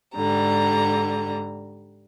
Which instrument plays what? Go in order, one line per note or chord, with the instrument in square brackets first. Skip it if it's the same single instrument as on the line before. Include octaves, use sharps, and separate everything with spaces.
[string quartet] G#2 D3 G3 A#5